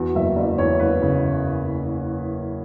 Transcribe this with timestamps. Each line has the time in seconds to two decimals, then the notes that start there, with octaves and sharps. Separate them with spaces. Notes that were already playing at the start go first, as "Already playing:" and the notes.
Already playing: E2 F#4
0.15 F#1 E5
0.36 F#1 D5
0.58 E2 C#5
0.79 F#1 B4
1.02 C#3